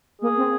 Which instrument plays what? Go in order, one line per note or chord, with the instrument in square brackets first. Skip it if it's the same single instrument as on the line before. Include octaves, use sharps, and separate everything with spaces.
[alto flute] A#3 [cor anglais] G#4
[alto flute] C4